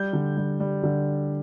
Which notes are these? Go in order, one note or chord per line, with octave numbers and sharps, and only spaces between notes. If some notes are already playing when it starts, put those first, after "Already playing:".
Already playing: G3 G6
D3
G3
G3
D3